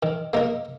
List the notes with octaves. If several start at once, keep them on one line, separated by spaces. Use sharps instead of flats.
D#3
A#3 D#4 A#4